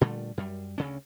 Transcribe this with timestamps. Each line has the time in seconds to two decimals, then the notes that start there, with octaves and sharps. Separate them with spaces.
0.01 A#2 D3 G3 A3
0.37 F#2 G3
0.78 D2 C#3 C#4